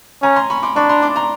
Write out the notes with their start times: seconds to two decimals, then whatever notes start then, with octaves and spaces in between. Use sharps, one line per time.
0.23 C#4 G#5 A#5
0.36 A#5 C6
0.50 B5 C#6
0.63 C6 D6
0.76 D4 B5 C#6
0.89 A#5 C6
1.02 C6 D6
1.16 A#5 C6